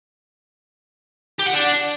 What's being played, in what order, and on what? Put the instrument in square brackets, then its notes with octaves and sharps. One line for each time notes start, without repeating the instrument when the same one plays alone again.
[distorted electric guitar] G4
F#5
D4